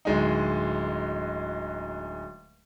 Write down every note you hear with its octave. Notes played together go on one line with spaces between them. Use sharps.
D1 G#3 D#4